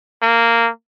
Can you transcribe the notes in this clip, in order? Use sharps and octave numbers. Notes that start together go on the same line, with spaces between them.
A#3